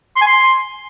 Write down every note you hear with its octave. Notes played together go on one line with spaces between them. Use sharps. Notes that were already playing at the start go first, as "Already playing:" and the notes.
C6
G#5
C6